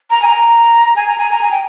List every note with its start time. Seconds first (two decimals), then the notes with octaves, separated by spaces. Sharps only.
0.10 A#5
0.22 G#5
0.27 A#5
0.96 G#5
1.08 A#5
1.18 G#5
1.31 A#5
1.41 G#5
1.51 G5